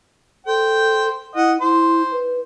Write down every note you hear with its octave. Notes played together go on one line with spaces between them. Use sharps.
A4 C5 G5
E4 D#5 F#5
E4 C5
B4